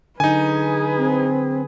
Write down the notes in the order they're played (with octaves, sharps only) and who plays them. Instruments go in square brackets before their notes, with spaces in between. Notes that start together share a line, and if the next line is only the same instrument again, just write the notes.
[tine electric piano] D3 F#3 [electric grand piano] D#4 G#5 [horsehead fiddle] G#4 B4
[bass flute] C4